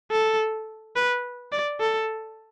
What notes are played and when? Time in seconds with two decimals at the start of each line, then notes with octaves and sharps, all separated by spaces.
0.11 A4
0.96 B4
1.52 D5
1.80 A4